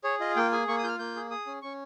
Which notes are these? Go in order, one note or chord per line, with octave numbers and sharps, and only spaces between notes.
G#4 C#5
F4 D#5
A#3 G5
G#4 G#5
A#3 C#6
D#6
F4 F6 G6
A#3 G6
G#4
G#4 D#6
C#4
C#4 C#6